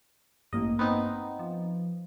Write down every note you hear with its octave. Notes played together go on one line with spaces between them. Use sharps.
A1 G2 A#3 D#5
B3 C4 D#4
F3